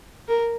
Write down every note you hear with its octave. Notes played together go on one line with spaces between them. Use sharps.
A#4